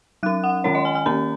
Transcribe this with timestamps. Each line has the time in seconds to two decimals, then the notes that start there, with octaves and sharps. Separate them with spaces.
0.23 F#3 C#4 F#6
0.44 F#5
0.64 D#3 G#3 C#4 C#5
0.75 D#5
0.85 G#5
0.95 G#5
1.06 D#3 A#3 C#4 A#5